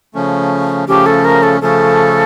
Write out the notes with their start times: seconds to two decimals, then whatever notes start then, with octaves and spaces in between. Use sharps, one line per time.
0.14 C#3 F3 A3 C#4
0.88 C#3 F3 A3 C#4 G4
1.06 A4
1.24 A#4
1.43 A4
1.61 C#3 F3 A3 C#4 A4